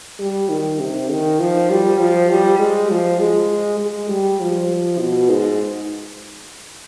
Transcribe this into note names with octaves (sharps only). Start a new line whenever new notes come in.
G3
D#3
C3
D#3
F3
G3
F3
G3
G#3
F3
G#3
G#3
G3
F3
B2
G#2